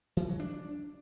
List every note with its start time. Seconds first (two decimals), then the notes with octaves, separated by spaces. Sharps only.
0.17 E3
0.28 F#3
0.40 D4